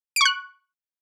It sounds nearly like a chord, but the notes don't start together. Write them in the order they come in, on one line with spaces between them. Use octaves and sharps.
D7 C#6 F#6